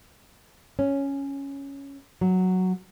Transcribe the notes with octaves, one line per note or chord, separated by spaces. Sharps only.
C#4
F#3